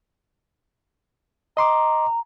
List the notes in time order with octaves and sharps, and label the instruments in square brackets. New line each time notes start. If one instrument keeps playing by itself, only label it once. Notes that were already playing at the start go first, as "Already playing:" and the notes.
[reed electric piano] D#5 C6 D6 [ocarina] A#5